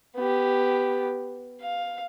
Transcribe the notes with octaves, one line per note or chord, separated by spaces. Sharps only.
B3 G4
F5